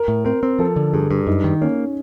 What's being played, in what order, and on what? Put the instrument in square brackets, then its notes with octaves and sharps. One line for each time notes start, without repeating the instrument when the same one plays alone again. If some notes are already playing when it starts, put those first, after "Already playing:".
Already playing: [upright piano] A#4
[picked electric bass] A2
[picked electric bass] C4 [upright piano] A#4
[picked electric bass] C4
[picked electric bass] F3 [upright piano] A4
[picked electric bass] D3
[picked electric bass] G2 [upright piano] G#4
[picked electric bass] G2
[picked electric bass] F#2 [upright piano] D#4
[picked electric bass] D#3
[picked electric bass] A#3 [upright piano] C#4